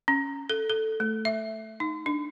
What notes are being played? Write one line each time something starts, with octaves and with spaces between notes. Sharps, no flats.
C#4
A4
A4
A3
E5
D#4
D4